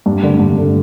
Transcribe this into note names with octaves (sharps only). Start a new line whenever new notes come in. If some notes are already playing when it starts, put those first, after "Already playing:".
G2
D3 A3
G2
D3 A3